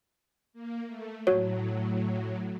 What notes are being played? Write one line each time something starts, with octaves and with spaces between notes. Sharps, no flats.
A#3
A3
A2 F#3 F#4 C#5